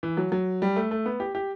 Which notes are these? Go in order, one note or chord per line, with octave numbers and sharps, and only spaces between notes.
E3
F#3
F#3
G3
A3
A3
B3
G4
G4